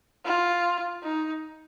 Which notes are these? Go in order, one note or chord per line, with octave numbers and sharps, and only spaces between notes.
F4
D#4